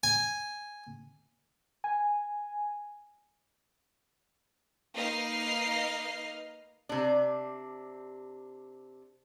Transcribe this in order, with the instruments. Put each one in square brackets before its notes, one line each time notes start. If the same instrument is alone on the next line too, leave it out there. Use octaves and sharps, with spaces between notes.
[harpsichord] G#5
[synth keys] G#5
[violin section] A#3 D#4 B4 D#5 F6 C7
[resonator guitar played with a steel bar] C3 D4